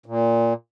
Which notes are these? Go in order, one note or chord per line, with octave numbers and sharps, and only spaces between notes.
A#2